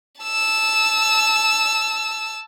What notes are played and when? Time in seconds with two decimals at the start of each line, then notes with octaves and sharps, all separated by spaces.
0.21 A5 E6